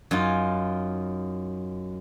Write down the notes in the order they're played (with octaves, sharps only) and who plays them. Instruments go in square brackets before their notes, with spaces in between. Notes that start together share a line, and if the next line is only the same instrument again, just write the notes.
[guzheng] F#2 D#4 F4